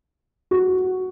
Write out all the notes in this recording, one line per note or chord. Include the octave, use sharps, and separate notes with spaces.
F#4